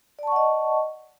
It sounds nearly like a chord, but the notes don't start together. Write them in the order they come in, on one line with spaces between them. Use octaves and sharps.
D5 A5 C#6 F#5 D#5